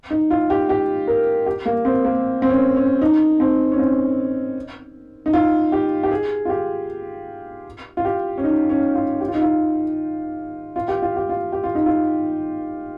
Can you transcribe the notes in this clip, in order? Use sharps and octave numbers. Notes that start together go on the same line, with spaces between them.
D#4
F4
G4
G4
A#4
G4
A#3
C4
A#3
C4
C#4
C#4
D#4
C4
C#4
C4
D#4
F4
G4
G4
G#4
F4
G4
F4
G4
C#4
D#4
C#4
F4
G4
F4
D#4
F4
F4
G4
F4
G4
F4
G4
F4
D#4
F4